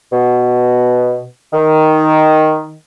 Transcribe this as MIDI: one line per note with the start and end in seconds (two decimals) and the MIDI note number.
0.12 1.24 47
1.53 2.75 51